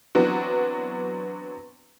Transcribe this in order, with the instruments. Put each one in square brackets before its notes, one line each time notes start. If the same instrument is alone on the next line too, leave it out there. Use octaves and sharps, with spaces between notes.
[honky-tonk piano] E3 F#3 B3 C4 D4 F#4